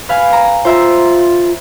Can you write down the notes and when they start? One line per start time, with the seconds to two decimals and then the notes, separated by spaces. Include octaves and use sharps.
0.09 B4 F5 G#5
0.33 A#5
0.65 F4 C5 E5 A#5